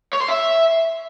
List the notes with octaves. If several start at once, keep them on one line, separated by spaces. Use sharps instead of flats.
C#5
C6
E5